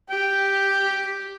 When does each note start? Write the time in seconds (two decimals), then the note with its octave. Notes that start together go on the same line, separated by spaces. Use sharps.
0.10 G4 G5